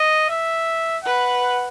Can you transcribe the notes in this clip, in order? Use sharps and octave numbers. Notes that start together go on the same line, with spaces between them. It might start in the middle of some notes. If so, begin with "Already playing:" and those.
Already playing: D#5
E5
B4 F#5